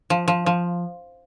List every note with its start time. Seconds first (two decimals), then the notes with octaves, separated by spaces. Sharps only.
0.10 F3
0.28 F3
0.46 F3